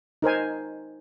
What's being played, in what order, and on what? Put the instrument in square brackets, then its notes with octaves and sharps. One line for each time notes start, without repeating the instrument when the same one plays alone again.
[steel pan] D#4 A#4 C5 G#5